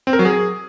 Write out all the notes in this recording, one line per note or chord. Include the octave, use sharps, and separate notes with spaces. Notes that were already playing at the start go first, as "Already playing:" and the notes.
C4
A#4
F#3
G#4